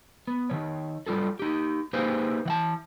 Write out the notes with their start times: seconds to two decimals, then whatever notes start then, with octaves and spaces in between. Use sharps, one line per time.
0.28 B3
0.50 D#3 E3 C#5
1.06 F#3 G3 F4 G#4 A4
1.39 D#4 G4
1.93 A#3 D#4 G4 G#4 B4 C5
2.45 E3 F#5 A5